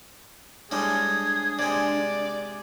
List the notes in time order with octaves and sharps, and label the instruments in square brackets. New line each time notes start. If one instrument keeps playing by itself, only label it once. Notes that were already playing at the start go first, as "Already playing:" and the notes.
[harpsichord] A2 G3 G#3 [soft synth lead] D4 [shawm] G#4
[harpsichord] C3 G#3 [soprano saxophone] D5